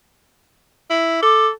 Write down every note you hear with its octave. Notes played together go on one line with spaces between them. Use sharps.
E4
A4 D6